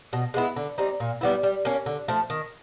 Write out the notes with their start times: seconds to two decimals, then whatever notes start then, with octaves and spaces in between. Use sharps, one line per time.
0.13 B2
0.34 G#3 B3 E4
0.56 D3
0.78 G3 C4 D#4
1.00 A#2
1.21 G3 B3 E4
1.43 G3
1.65 A#3 C#4
1.86 D3
2.08 F3 A3
2.30 D#3